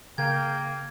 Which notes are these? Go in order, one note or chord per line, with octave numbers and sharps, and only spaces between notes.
C#3 A#3 G5 G#6